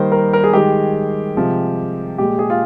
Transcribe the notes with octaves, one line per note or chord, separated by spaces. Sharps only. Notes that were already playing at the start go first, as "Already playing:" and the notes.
Already playing: D#3 G3 A#3 C5
A#4
A#4
G#4
D#3 G#3 G4
C3 F3 G#3
A#2 G#3 G4
G#4
F4